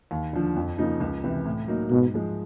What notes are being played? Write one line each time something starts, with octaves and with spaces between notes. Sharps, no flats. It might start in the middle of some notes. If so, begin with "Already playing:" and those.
D#2
D3 F3
F2
C#3 F3 A#3 D#4
C#2
C3 E3
A2
F#3 A#3 D#4
G#2 B2
F3 G#3